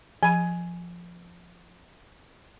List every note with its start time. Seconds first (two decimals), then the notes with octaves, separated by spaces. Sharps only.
0.23 F3 G#5 B5